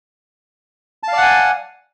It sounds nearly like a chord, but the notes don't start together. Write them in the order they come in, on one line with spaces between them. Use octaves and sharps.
A5 F5 D5 F#5 G#5